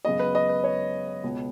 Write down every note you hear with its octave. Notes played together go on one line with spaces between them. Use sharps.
F#2 C#3 G#3 B3 D#5
B4
D#5
B4
C#5
C#2 B2 B3